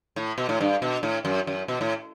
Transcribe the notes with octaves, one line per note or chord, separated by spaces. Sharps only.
A2
B2
A2
G2
B2
A2
F#2
F#2
B2
A2